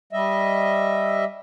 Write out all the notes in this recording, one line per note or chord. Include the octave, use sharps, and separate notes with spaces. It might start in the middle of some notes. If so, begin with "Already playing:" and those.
G3 D#5 E5